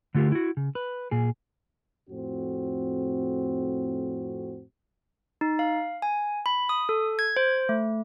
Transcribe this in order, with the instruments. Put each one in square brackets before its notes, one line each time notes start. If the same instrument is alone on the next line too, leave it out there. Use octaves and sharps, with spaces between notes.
[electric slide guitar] D3 A3 F4 G4 A#4
E4 F#4
C#3
B4
A#2 G#4
[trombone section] F2 A2 C4 F#4
[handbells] D#4
F5
G#5
B5
D#6
A4
G#6
C5
A3